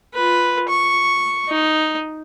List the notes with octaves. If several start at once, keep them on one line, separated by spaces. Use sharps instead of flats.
F4 B4
C#6
D#4